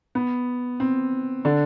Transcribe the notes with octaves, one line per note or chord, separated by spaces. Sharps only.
B3
C4
D3 D4